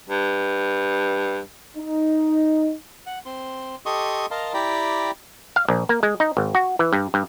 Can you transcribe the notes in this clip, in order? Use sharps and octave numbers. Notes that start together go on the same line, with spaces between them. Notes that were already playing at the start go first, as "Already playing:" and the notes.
G2
D#4
F#5
C4 C6
G4 A4 D#5 C6 C#6 D#6
A#4 D#5 F5 A5 A#5 C6
E4 G4 D5 G5 A#5 B5
F5
A#1
A#3
G#3
D#4
G#1
F#4
E3
G2
G2